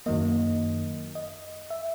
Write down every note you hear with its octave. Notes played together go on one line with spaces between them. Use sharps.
F#2 D#3 F#3 A#3 D#5
D#5
E5